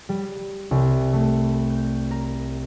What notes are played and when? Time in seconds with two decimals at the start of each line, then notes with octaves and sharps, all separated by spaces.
0.09 G3
0.71 C2
1.13 A3
1.70 G6
2.11 A#4